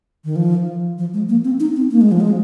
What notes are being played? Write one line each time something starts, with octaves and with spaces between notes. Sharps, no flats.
D#3
F3
F3
G#3
A#3
C4
D#4
C4
A#3
G#3
F3
G#3